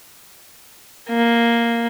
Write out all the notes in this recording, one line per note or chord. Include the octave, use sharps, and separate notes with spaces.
A#3